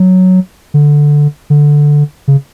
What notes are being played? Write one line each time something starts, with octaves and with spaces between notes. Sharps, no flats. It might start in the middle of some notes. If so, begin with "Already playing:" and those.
Already playing: F#3
D3
D3
C#3